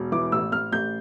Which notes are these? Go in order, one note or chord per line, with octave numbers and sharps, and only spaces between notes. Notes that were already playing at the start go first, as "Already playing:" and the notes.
Already playing: E1
E3 D6
A1 E6
A1 F6
A1 G6